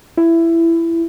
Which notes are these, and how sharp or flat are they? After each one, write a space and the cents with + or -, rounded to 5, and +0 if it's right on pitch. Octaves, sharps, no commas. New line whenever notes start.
E4 +15